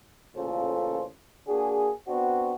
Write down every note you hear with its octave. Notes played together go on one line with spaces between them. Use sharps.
A1 A#2 C#3 F4 A4 C5
A#3 D4 F#4 G#4
B3 C4 D4 F#4